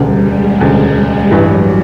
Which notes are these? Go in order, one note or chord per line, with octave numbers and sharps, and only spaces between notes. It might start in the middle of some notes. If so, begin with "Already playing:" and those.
Already playing: E1 D2 C#3 G3
G#3
E1 D2 C#3 G3
A1 G2 E3 F#3